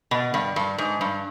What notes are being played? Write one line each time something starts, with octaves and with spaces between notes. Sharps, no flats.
B2
G2
G2
G#2
G2